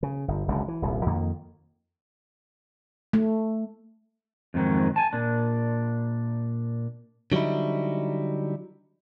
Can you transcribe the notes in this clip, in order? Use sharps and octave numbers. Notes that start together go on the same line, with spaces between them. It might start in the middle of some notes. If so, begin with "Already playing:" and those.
C#3
G1
F#1 C#2 F#2 D3
E3
D#1 C2
F2 D#3 A#3
A3
F2 G#2 D#3 F#3
G#5 A5
A#2 D4
D3 F#3 G3 D#4 E4